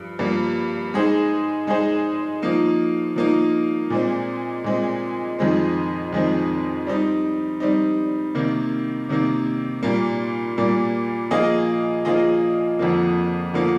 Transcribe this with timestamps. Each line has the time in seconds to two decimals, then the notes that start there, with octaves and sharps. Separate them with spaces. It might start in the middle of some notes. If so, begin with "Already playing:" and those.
Already playing: G2 F3
0.19 G2 F3 A#3
0.94 G#3 D#4 G#4 C5
1.67 G#3 D#4 G#4 C5
2.42 F3 A#3 D#4
3.16 F3 A#3 D#4
3.90 A#2 G#3 C4
4.64 A#2 G#3 C4
5.39 F2 D#3 G#3 C4
6.13 F2 D#3 G#3 C4
6.87 G3 C4 D#4
7.60 G3 C4 D#4
8.35 C3 D#3 A#3
9.09 C3 D#3 A#3
9.83 A#2 G3 A#3
10.58 A#2 G3 A#3
11.31 F3 A#3 F4 G#4 D#5
12.05 F3 A#3 F4 G#4 D#5
12.79 F2 D3 F3 A#3
13.54 D3 F3 A#3